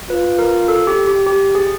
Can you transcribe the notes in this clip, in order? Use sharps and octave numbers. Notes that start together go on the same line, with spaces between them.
F4 B4
A#4
A4
G4
G4
G4
G#4